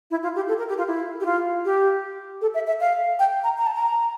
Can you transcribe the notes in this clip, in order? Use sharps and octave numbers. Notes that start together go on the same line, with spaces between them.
E4
F4
G4
A4
A#4
G4
F4
E4
G4
F4
G4
A4
E5
E5
F5
G5
A#5
A#5
A5
A#5